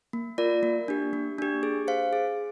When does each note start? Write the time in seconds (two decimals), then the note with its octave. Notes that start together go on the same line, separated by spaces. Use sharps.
0.13 A#3
0.38 F4 A#4 D5
0.63 A#3
0.88 D4 G4
1.13 A#3
1.38 D4 G4
1.63 G#4
1.88 C5 F5
2.13 G#4